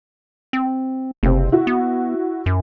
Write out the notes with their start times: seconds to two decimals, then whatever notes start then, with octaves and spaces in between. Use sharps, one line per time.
0.53 C4
1.23 F#1 C3 C4
1.52 E4 F#4
1.67 B3
2.46 F#2